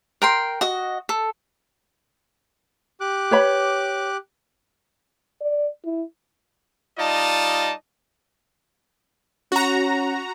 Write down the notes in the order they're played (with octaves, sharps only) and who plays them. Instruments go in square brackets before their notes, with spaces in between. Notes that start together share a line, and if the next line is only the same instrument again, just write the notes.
[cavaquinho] A#4 G5 C6
F#4 D#5
A4
[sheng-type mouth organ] G4 D6 F#6
[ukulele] B4 C#5 B5
[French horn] D5
E4
[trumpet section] G3 D#4 F4 D5 D#5 A5
[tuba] C#4 [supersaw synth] F#4 A#5